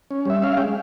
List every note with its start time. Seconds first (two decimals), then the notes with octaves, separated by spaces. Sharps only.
0.11 C#4
0.25 G3 E5
0.42 C#4 F5
0.58 G#3 G5